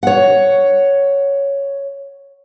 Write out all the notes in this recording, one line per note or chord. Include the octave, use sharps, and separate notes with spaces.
C#5 F#5